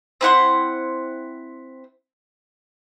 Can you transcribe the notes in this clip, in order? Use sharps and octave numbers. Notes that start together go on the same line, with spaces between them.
C4 E4 F#5 C6